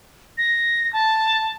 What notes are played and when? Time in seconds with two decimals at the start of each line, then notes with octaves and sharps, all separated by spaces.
0.38 A#6
0.93 A5